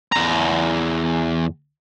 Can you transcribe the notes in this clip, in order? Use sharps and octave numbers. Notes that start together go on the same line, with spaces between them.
E2 A#5